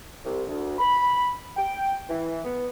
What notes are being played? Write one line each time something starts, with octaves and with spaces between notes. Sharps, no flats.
C2
D2
B5
G5
E3
B3